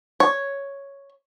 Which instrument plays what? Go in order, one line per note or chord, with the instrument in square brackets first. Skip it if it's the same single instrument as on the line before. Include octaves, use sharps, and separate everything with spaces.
[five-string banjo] C#5